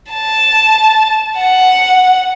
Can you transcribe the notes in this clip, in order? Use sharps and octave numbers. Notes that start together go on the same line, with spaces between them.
A5
F#5